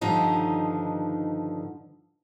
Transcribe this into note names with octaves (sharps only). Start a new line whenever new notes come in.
G2 D3 D#3 F3 D#4 A#5